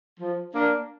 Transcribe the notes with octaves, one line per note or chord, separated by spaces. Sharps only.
F3
A#3 D4